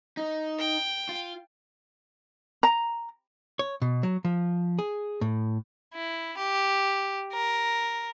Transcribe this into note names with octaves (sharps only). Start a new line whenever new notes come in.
D#4
G5
F4
A#5
C#5
B2
F#3
F3
G#4
A2
E4
G4
A#4